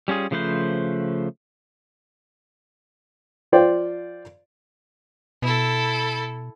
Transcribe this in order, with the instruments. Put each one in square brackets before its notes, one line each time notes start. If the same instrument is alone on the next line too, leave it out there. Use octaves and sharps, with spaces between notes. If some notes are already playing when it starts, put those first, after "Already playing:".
[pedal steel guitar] G3 C#4 F4 G#4
C#3 F3 A3 B4 C5
[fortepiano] F3 F4 C5 D5 G5
[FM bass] B2 [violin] E4 A4